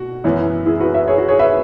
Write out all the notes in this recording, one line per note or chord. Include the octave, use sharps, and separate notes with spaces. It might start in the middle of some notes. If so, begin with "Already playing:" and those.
Already playing: B2 F#4
F#2 E3 B3
E4 G#4
F#4 B4
B4 E5
G#4 C#5
F#4
G#4 C#5
B4 E5